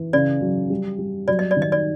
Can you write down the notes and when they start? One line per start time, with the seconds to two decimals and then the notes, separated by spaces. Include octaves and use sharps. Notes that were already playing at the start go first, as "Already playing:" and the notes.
Already playing: E3
0.13 C#3 D5
0.41 F#3
0.70 G3
0.99 G3
1.28 F#3 D5
1.39 D#5
1.51 D5
1.57 D#3
1.62 D#5
1.72 D5